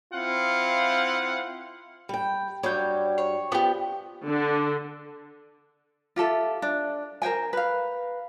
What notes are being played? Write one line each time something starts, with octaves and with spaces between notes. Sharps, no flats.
C4 E4 F4 F5 F#5
G3 G5
G2 F#3 G3 C#5 G6
C#5
F3 B3 G4
D3
F4 G4 A4 E5
D4
A#4 C5 G5 G#5
B4 F5